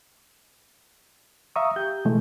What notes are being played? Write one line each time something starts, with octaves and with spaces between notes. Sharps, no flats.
E5 F5 A#5 C#6 D#6
G4 G6
B2 E3 G#3 A3